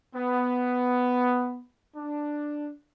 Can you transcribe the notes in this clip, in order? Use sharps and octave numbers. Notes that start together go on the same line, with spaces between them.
B3
D4